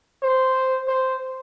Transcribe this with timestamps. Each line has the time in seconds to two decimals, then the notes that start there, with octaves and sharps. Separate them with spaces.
0.23 C5
0.88 C5